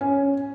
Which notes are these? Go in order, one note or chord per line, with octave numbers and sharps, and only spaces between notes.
C#4